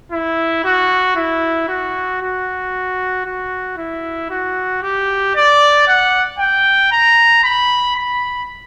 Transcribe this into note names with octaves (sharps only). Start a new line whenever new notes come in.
E4
F#4
E4
F#4
F#4
F#4
E4
F#4
G4
D5
F#5
G5
A#5
B5
B5